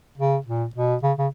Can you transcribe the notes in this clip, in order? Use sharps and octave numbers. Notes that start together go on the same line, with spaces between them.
C#3
A#2
B2
C#3
C#3